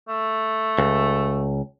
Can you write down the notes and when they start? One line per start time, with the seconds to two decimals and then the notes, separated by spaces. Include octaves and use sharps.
0.08 A3
0.78 C#2